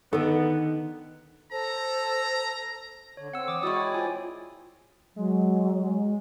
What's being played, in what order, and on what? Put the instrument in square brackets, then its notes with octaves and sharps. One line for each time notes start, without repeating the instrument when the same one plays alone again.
[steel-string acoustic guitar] D3 D#3 [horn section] B3 [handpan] D#4 [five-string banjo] A4
[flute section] A4 A5 E6 [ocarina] C5 [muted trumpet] A#5
[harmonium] D3 [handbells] C#5
[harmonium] C4 [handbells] F#5 E6
[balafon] E3 [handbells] D6 D#6
[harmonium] G#3 E4 D5 [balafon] F#4 F#5 C#6 [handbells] D#6
[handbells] C#5 G5
[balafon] F4 C5 [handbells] G#5
[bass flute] F#3 [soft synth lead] G#3